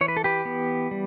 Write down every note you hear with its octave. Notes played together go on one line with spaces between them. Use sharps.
E3 C#5
B4
A4
G4 B4
B3
G3